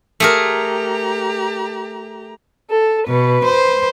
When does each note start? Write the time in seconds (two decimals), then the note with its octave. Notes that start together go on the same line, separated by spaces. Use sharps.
0.20 A3 G4 G#4 A#4 A#5
2.70 A4
3.08 B2 B4
3.45 C5